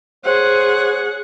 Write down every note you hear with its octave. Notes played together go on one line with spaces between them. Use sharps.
G#4 C5 C#5 F#5